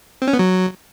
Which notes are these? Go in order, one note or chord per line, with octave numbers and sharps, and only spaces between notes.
C4
C#4
B3
F#3